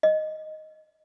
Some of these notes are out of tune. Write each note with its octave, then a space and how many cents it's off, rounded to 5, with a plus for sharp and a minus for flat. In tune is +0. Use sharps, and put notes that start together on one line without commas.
D#5 +0